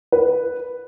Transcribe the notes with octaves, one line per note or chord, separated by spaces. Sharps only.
B4